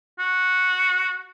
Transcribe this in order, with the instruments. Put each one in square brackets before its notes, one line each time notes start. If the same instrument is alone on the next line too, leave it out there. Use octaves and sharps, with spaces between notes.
[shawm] F#4